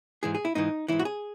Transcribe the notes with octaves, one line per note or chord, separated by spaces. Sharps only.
G#2 E3 G#4
G#4
E4
G#2 E3 D#4
G#2 E3 E4
F#4
G#4